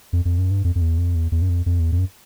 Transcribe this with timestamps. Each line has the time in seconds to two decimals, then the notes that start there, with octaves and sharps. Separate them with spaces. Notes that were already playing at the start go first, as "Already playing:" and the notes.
0.13 F2
0.25 F2
0.38 F#2
0.51 G2
0.64 F2
0.75 F2
0.81 E2
0.98 F2
1.15 E2
1.32 E2
1.42 F#2
1.49 F2
1.66 F2
1.79 E2
1.92 F2
1.98 F#2